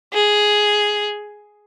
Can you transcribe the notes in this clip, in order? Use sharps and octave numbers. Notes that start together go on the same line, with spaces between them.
G#4